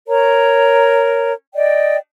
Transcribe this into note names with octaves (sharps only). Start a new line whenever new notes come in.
A#4 C#5 A#5
D5 D#5 G5